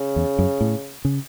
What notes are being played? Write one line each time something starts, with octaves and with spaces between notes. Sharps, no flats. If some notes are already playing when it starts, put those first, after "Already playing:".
Already playing: C#3
E2
F#2
A2
C#3